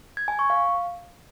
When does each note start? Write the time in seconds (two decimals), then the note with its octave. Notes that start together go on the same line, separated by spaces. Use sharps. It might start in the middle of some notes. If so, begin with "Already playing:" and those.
0.17 G#6
0.28 G#5
0.39 C#6
0.50 F5